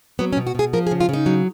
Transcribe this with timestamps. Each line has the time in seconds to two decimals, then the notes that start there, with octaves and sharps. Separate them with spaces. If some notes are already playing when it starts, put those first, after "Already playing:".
0.19 F#3 B3
0.33 C#4
0.37 B2
0.47 F#4
0.55 B2 G#4
0.73 F3 A#4
0.87 G#4
0.91 C#3
1.00 F4
1.09 C#3 D#4
1.26 F#3